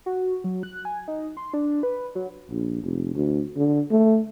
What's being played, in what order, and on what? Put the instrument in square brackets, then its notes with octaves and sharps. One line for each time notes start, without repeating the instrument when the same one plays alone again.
[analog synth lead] F#4
F#3
F#6
G#5
D#4
C6
D4
B4
F#3
[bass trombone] A#1
F1
D2
D3
A3